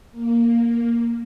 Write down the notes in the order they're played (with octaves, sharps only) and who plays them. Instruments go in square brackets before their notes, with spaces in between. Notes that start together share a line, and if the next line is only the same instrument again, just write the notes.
[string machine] A#3